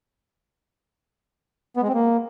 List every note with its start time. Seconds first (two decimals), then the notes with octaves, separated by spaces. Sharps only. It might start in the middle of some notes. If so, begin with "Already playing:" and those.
1.77 B3
1.82 G#3
1.88 C4
1.94 A#3